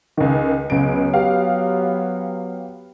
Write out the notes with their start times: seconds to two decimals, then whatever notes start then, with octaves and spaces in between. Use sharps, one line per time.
0.17 C#2 D#3
0.70 C#2 F#3 B3 D7
1.14 G4 F5